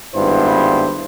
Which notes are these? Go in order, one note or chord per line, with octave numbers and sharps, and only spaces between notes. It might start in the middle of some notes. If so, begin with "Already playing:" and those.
G#1 G2 B3 E4 C5